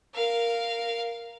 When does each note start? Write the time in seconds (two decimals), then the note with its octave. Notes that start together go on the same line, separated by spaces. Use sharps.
0.15 A#4 F5